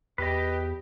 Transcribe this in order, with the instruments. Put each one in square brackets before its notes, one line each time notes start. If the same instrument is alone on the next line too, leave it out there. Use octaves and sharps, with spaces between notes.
[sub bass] E2 [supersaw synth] G4 [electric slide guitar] B4 D#5